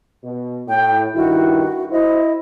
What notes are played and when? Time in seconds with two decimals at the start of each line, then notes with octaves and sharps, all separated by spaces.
0.24 B2
0.68 A2 G5
1.15 G2 D#3 E4 F#4
1.92 E4 C5 D#5